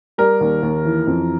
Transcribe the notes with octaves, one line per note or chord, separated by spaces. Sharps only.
G3 A#4
D#2
D#2
E3
F2